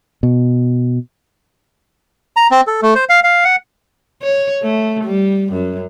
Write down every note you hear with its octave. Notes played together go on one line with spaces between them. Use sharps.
B2
A#5
C4
A4
A3
C5
F5
F5
F#5
C#5
A3
G3
F#2